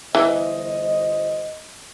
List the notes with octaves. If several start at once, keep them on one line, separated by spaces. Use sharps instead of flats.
G1 E3 C5 D#5